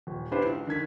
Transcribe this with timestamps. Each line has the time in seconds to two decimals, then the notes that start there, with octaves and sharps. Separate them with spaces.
0.07 D#1
0.31 B3 D4 E4 G4 B4 C5
0.45 C#2
0.67 D3 D#3 G#6 B6